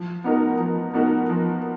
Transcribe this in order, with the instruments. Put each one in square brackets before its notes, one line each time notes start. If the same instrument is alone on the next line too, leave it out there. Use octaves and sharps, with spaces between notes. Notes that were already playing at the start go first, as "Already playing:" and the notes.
Already playing: [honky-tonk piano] F3
B3 D#4 F#4 A#4
F3
B3 D#4 F#4 A#4
F3